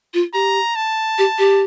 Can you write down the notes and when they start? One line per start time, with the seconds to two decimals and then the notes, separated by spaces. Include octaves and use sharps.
0.14 F4
0.34 G4 A#5
0.76 A5
1.18 G4
1.38 G4